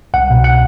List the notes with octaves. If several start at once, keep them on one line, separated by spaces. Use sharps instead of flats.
C2 F#5
B2
F#5